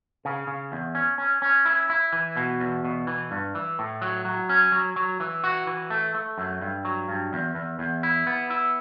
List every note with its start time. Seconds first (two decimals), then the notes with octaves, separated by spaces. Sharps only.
0.25 C#3
0.47 C#3
0.72 E2
0.95 C#4
1.18 C#4
1.42 C#4
1.65 E4
1.90 E4
2.13 E3
2.37 B2
2.60 E2
2.85 B2
3.07 E3
3.31 G2
3.55 E3
3.79 A2
4.02 F#3
4.25 F#3
4.49 C#4
4.72 F#3
4.96 F#3
5.20 E3
5.44 F#4
5.67 E3
5.90 A3
6.14 A3
6.38 F#2
6.61 G2
6.85 F#3
7.09 G2
7.33 E2
7.55 E2
7.79 E2
8.03 E4
8.27 B3
8.50 E4